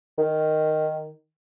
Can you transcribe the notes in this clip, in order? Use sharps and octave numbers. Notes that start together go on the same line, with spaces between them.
D#3